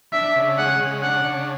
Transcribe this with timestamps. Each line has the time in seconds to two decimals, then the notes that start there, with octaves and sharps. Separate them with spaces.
0.13 D4 E5
0.36 C#3
0.58 G#3 F#5
0.80 C#3
1.03 D4 F#5
1.25 C#3